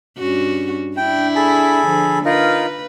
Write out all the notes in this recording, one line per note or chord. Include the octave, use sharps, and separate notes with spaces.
G2 C#4 F#4
D4 E4 G5
G#4 A4 B5
D3 F3
D#4 F4 A#4 B4